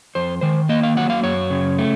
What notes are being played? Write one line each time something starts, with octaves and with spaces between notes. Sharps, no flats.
F2 C5
D#3 C5
A#3 D#5
F5
F#3 F#5
F5
F#2 C#5
C#3
A3